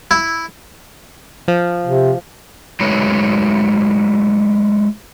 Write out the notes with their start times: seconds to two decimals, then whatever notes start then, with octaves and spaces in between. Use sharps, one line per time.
0.11 E4
1.48 F3
1.86 C3
2.80 F#3 G#3 A3 D#4 B4 C#5